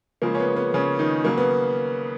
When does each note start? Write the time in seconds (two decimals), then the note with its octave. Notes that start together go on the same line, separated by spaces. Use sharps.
0.22 C#3 F3 G#3 A#3
0.35 C#4
0.39 B3
0.57 B3
0.74 C#3 C#4
0.99 D#3 D#4
1.25 C#3 F#3 A#3
1.37 B3